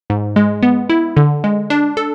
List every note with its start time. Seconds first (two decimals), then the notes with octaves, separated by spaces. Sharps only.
0.10 G#2
0.36 G#3
0.63 B3
0.89 E4
1.17 D3
1.44 G#3
1.70 D4
1.97 A4